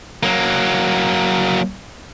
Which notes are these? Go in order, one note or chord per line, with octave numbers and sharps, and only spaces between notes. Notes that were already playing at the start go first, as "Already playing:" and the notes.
F#3 A#3